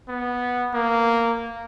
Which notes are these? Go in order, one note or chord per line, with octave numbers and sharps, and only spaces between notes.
B3
A#3